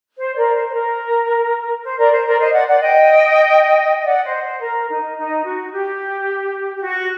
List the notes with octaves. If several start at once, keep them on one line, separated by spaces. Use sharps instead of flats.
C5
A#4 D5
C5
C5
A#4
C5
A#4 D5
C5
A#4 D5
C5 D#5
D5 F#5
D5 F#5
D#5 G5
D#5
D5 F#5
C5 D#5
C5
A#4
D#4
D#4
F#4
G4
G4
F#4